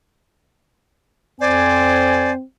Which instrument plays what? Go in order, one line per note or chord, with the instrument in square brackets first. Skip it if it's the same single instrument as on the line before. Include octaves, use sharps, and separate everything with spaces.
[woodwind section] F2 C5 G#5 [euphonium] C4 [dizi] D5